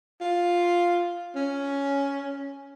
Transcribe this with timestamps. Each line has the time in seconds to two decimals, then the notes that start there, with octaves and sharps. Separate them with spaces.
0.21 F4
1.35 C#4